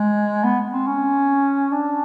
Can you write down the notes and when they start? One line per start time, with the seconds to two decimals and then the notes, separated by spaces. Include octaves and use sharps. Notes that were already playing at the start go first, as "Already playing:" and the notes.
Already playing: G#3
0.44 B3
0.72 C4
0.87 C#4
1.72 D4